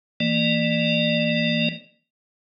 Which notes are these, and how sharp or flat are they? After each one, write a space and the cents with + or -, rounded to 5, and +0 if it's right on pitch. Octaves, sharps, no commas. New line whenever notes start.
E3 +0 A#3 -20 D5 +35